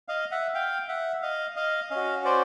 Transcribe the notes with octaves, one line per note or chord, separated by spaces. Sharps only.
D#5 F5
E5 F#5
F5 G5
E5 F#5
D#5 F5
D#5 F5
C#4 D#5 F5
F#4
C5 D5